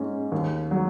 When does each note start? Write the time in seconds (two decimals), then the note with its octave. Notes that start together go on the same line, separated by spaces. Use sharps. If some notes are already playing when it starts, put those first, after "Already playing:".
Already playing: G#2 C#4
0.32 D#2
0.71 F#3